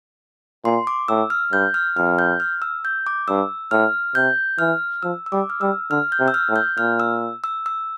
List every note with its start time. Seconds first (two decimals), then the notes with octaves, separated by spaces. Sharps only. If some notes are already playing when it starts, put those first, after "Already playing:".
0.65 A#2 C6
0.87 D6
1.08 A2 E6
1.30 F6
1.52 G2 G6
1.74 F6
1.97 F2 F6
2.19 G6
2.40 F6
2.62 E6
2.85 G6
3.07 D6
3.28 G2 E6
3.71 A2 F6
4.15 C3 G6
4.59 E3 F6
5.03 F3 E6
5.26 E6
5.32 G3 D6
5.50 F6
5.61 G3 E6
5.91 D3 F6
6.12 G6
6.20 C3
6.28 E6
6.34 F6
6.49 A2
6.56 G6
6.78 A#2 F6
7.00 E6
7.44 E6
7.66 E6